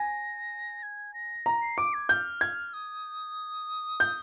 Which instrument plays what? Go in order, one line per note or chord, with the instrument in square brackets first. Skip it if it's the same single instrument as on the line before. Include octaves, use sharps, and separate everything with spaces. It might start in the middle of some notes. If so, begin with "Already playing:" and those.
Already playing: [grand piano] G#5 [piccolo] A#6
[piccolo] G#6
A#6
[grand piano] A#5
[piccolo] C7
[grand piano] D6 [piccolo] D7
[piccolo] G#6
[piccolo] F6 [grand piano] G6
[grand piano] G#6
[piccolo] D#6
[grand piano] G6